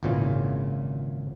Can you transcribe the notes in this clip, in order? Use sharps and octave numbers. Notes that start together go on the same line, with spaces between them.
G#1 C#2 A#2 C#3 E3 F4